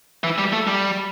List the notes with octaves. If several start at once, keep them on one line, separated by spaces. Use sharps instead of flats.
E3
G3
A3
G3